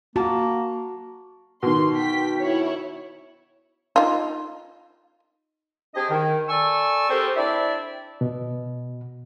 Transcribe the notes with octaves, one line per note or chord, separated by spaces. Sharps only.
A#3 F#4 A5
B2 D#3 C6
G5 B6
E4 C#5
D#4 F4
C4 D4 G4 G#4 C5 D#5
D#3
A4 D5 G#5 C#6 E6
C4 G4 A4 A#4 C5
C4 D4 E4 D5 E5
B2